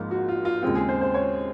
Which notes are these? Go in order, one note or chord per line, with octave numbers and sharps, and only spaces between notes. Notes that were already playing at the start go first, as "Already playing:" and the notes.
Already playing: G#1 G#2 F3 A#3 F4
F#4
F4
F4
D#2 C#3 G#3 C4 F4
G#4
C5
C5
C#5